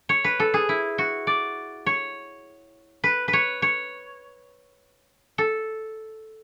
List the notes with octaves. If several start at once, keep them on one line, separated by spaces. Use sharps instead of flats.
C#5
B4
A4
G#4
E4
F#4
D5
C#5
B4
B4
C#5
C#5
A4